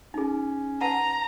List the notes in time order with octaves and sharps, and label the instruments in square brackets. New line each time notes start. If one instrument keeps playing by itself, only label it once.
[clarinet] C#4 [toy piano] D#4 G#4
[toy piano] B4 F#5 A5 [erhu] A#5